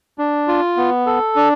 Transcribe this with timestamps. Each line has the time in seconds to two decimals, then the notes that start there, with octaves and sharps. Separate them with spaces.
0.18 D4
0.48 F4
0.77 B3
1.06 A4
1.36 D4